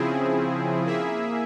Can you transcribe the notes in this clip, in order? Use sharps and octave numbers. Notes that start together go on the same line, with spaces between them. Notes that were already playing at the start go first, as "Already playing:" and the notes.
Already playing: C#3 F3 C4 E4 G#4
A#3 E4 G#4 E5